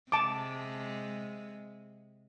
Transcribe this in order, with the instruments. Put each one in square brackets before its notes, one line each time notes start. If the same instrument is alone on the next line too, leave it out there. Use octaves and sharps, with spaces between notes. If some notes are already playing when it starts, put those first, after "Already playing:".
[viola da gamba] C3 G#3 [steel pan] A5 D6